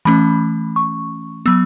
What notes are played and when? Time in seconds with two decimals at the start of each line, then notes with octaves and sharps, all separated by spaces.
0.05 E3 A3 C#4 B5
0.76 C#6
1.46 F#3 B3 E6